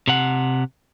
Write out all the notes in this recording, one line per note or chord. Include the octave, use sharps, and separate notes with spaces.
C3 F#5